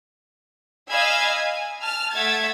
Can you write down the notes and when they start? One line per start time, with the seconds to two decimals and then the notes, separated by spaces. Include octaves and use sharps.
0.91 D#5 F5 G#5 B5 E6 G#6
1.30 G#5
1.81 A5 F6
2.13 A3 E5 F#5 G#6 A6